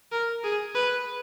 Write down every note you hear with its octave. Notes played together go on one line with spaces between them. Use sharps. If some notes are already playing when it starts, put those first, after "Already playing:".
A#4
G#4
B4